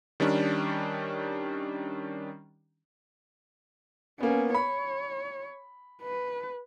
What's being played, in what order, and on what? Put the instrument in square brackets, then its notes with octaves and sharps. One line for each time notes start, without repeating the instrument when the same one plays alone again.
[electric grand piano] D#3 G3 C#4 D4
[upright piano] A#3 B3 [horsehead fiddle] C#4
[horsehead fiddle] C#5 [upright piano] B5
[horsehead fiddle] B4